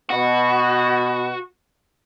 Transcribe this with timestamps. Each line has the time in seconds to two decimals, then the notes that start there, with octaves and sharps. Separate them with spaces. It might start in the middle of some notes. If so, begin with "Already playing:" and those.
0.10 B2 F#4